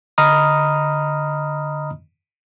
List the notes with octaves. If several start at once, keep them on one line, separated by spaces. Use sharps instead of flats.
D3 D#5 A#5 B5 D#6 F6